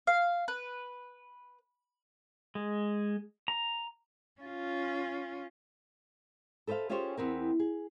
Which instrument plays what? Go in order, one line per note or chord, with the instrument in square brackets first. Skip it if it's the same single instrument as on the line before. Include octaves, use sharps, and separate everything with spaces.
[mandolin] F5
B4
[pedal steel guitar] G#3
A#5
[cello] C#4 F4
[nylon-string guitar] A4 B4 C5 D#5 F5
C#4 F4 G4 G#4 C5 C#5
E2 B3 C4 A#4
G#4